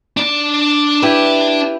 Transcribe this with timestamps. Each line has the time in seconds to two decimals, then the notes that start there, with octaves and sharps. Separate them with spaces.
0.17 D4 D5
1.02 E4 G4 B4